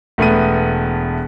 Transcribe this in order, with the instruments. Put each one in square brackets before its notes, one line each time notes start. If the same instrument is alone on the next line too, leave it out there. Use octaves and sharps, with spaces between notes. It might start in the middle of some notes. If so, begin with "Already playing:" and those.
[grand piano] E1 A3 B3 D#7